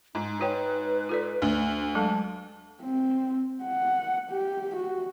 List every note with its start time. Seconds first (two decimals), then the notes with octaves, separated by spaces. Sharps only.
0.15 G#2 D#4
0.41 F#4 B4 C#5 G5
1.09 F4 A4 D5
1.42 D2
1.95 F#3 G#3 A4 A5
2.82 C4
3.64 F#5
4.30 G4
4.76 F#4